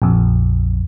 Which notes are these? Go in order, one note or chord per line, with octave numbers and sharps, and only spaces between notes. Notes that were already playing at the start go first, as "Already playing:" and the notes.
A#1 F2